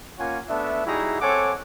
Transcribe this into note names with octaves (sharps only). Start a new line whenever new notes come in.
A#3 C#4 F4 C#5 F#5 G#5
A3 B3 D4 E5
G3 D#4 E4 F#4 G#4 A#5
C4 A4 C#5 F#5 G#5 D6